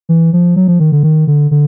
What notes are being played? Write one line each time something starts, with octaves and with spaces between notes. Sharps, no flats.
E3
F3
F#3
F3
D#3
D3
D#3
D3
D3